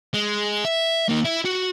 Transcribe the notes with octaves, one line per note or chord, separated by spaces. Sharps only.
G#3
E5
A#3 D#4
E4
F#4